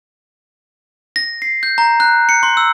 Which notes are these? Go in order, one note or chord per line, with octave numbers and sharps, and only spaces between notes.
A#6
C7
G6
A#5
F#6
C#7
C6
E6